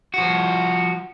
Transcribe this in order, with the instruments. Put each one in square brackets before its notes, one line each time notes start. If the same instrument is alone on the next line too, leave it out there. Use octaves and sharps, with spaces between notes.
[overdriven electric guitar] F3 F#4